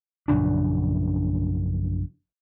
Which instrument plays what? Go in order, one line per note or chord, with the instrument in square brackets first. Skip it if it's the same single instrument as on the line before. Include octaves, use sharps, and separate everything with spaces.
[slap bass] A#1 F#2 C#3 D4